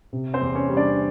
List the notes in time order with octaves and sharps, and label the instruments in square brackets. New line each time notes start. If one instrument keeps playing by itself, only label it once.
[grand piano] C3
C4 C5
E2
C#4 C#5
G3
D4 D5